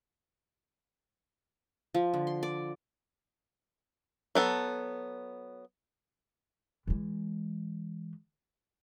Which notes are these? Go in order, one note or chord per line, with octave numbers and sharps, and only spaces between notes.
F3
D3
C6
D5
F#3 B3 A4
E3 G#3